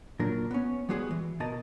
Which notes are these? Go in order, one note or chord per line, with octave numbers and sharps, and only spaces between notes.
A#2 F#3 D4 A#4
B3 C#4
G3 G#3 B3 F#4 G#4
E3
B2 A#4 D#5 A5